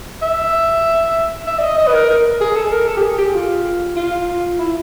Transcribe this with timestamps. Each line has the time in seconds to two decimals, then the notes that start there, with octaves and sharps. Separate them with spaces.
0.22 E5
1.47 E5
1.59 D5
1.63 D#5
1.78 D#5
1.87 B4
1.93 A#4
2.09 A#4
2.41 G#4
2.56 A4
2.72 A#4
2.87 A4
2.97 G4
3.03 G#4
3.18 G4
3.35 F4
3.97 F4
4.59 E4